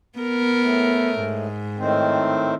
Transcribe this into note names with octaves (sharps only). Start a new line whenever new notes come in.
B3 A#4
A2
G#2
A2 D#3 C4